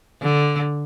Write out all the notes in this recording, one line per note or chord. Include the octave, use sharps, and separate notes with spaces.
D3